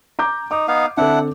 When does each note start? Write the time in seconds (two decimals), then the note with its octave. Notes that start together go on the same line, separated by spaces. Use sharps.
0.19 A#5 D6 G6
0.51 D#4 D6
0.68 B3 D#4 F5
0.97 D3 C4 D4 E4 A4 F#5